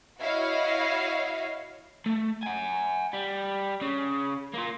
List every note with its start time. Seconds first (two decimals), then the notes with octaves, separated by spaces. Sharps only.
0.21 E4 F#4 C#5 D#5 F5
2.06 A3
2.43 F#5 G#5
3.13 G3
3.82 C#3
4.54 A#3 F4